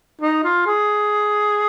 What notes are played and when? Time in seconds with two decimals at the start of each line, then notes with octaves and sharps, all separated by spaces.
0.22 D#4
0.44 F4
0.66 G#4